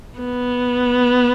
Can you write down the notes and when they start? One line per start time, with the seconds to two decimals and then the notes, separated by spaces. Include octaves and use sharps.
0.19 B3